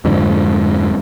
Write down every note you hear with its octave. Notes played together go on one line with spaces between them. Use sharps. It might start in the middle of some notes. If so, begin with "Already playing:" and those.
F2 G#2 D3